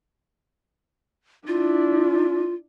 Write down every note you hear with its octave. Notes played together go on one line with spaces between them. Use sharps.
D4 E4 F4